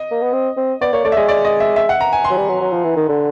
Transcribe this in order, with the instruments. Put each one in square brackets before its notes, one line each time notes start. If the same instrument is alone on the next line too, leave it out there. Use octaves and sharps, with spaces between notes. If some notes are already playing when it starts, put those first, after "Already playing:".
Already playing: [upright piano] D#5
[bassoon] A#3
B3
C4
C4
[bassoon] B3 [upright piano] D5
[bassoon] A#3 [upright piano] C#5
[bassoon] A3 [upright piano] D5
[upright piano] E5
[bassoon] G#3 [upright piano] D#5
[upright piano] D5
D#5
E5
E5
F#5
A#5
G#5
C6
[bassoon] F#3
G3
F#3
F#3
F3
E3
D#3
D3